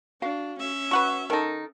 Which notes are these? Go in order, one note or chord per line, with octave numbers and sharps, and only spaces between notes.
D4 F#4 F5
C#4 E5
F#4 B4 F#5 C#6
D#3 D#4 A4 A#4